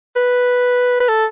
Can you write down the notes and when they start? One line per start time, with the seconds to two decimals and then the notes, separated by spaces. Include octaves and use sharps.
0.16 B4
1.00 B4
1.08 A4